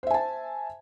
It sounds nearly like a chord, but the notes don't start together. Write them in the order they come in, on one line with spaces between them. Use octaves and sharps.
C5 E5 G#5 A5